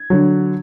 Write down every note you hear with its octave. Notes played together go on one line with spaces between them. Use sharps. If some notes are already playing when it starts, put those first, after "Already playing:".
Already playing: G#6
D3 F#3